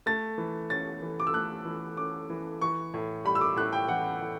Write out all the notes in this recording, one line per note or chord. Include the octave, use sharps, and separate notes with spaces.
A3 A6
E3
C#4 A6
E3
D6
E6
A3 F#6
E3
C#4 D6
E3
E3 C#6
A2
G3 B5
E6
D6
A2 F#6
G5
E3 F#5
A2